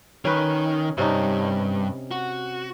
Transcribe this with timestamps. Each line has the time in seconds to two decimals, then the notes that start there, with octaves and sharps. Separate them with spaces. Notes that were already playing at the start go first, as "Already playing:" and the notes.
0.25 D#3 C#4 B4
0.98 G2 C3 C#4 D#4
2.11 F#4